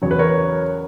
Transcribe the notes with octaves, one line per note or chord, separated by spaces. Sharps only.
E2 C#3 F#3 C#5
B4
A#4 C#5